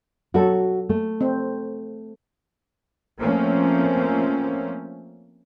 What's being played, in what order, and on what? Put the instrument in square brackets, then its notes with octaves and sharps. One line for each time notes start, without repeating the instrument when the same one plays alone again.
[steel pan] F#3 A4 [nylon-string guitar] F#4
[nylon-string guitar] A3
[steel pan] C4
[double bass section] F3 A3 A#3 C4 C#4